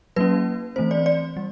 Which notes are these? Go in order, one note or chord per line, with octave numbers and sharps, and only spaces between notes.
F#3 A#3 C#4 B4
E3 A3 C4 C5
D5
D5
G3